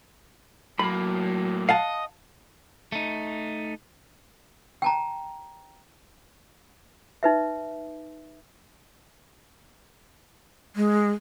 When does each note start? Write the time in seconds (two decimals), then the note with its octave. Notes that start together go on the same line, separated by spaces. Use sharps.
0.79 A2 F#3 A#3 B5
1.69 D#5 F5 F#5 A5
2.92 A3 D#4
4.82 G5 A5 A#5
7.23 D#4 B4 E5
10.76 G#3